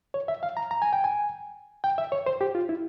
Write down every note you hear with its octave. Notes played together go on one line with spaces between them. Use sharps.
C#5
E5
F5
A#5
A#5
G#5
G5
G#5
G5
E5
C#5
C5
G4
F4
E4